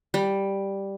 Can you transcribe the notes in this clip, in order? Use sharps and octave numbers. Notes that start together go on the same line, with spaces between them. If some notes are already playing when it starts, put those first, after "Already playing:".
G3